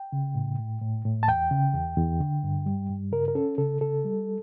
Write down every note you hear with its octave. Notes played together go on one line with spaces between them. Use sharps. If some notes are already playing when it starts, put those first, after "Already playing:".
Already playing: G5
C#3
A2
A2
A2
A2
A5
E2 G5
C#3
E2
E2
D3
G2
G3
G2
C#3 A#4
A#4
C#4 A4
C#3 A4
C#3 A4
G3